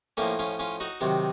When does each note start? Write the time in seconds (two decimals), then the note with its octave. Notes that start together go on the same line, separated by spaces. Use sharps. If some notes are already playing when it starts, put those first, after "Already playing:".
0.17 A2 F3 A#3 C#4
0.39 C#4 F4
0.59 C#4 F4
0.80 D#4 F#4
1.01 C3 D#3 F#3